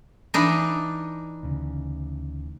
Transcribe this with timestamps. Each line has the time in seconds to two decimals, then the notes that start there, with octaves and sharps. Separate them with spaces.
0.34 E3 D4 D#4
1.43 D2 C#3